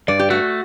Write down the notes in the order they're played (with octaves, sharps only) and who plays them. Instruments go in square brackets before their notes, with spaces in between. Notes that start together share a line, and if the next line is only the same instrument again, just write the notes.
[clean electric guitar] G2 [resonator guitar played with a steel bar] D5
[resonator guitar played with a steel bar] G4
[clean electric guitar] A3 [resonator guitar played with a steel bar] F#4